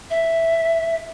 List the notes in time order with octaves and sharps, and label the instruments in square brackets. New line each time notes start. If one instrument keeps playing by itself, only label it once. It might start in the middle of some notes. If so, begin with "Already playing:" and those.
[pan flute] E5